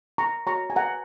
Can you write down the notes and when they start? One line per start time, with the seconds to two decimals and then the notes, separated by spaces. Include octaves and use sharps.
0.18 A#5 C#6
0.47 F#4 C#5 A#5 C#6
0.70 G#5
0.76 F#5 A#5